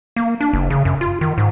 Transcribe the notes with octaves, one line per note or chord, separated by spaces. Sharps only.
A#3
D4
F#1
C#3
F#2
F4
D#3
G#2